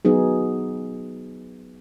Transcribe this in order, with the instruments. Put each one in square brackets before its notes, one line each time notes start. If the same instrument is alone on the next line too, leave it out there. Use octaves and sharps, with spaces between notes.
[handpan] F#3 B3 D#4 G#4